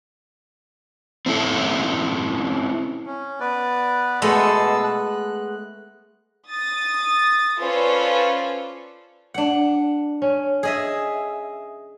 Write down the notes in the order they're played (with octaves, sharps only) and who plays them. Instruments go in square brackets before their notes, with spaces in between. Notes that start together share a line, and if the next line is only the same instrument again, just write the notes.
[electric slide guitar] C4 C#4 E4 A4
[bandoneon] C#4
B3 B4 D5
[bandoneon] B2 A5 E6 [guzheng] G#3 A3 B3
[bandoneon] F#6
[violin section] D#6 A6
C#4 F4 A4 B4 C5 D5
[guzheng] D4 F#5
[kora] C#4
[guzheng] G#4 D#5 E5